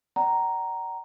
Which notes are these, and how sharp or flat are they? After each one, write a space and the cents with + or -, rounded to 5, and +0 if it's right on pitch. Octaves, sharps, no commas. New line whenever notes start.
D5 +0 F#5 +40 A#5 +0